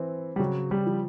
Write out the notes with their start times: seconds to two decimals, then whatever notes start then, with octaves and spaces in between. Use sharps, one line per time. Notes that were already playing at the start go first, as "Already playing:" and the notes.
Already playing: E3 C4
0.36 G3
0.39 C#3 F#3
0.71 G3
0.86 F3